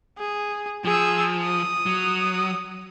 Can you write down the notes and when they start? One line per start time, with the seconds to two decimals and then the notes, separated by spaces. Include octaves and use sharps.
0.18 G#4
0.85 F3 G#4 E6
1.43 D#6
1.86 F#3